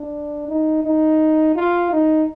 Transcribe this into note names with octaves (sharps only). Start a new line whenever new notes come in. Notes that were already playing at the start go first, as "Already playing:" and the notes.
Already playing: D4
D#4
D#4
F4
D#4